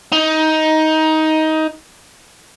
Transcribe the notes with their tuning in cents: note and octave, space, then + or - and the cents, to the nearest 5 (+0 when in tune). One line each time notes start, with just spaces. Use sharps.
D#4 +15